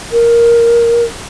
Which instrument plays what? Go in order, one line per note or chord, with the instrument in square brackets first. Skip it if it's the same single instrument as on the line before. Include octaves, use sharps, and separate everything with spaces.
[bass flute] A#4